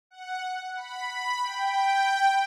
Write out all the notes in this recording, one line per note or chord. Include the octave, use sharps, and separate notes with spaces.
F#5
B5
B5
G5